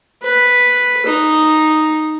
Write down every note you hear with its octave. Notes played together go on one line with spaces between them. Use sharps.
B4
D#4